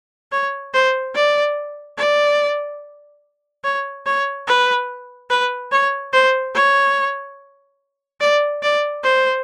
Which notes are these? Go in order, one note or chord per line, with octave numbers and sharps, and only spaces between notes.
C#5
C5
D5
D5
C#5
C#5
B4
B4
C#5
C5
C#5
D5
D5
C5